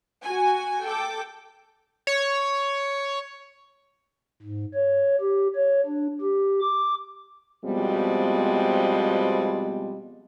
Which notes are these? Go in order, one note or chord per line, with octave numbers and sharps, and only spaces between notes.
F#4 G#5
A4 G5 D6
C#5
G#2
C#5
G4
C#5
D4
G4
D6
B2 F3 G3 G#3 B3 C4